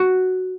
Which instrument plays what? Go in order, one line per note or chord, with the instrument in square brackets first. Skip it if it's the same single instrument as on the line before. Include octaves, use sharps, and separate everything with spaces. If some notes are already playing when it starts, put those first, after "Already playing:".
Already playing: [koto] F#4